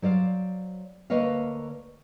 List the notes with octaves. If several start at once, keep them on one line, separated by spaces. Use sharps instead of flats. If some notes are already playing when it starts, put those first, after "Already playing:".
F#3 C5 D5 F5
D2 A#3 B4 C#5 D#5 F5